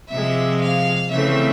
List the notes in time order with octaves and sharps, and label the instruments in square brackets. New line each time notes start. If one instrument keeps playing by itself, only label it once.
[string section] C3 F3 G#3 E5
F5
C#3 E3 A3 C4 E5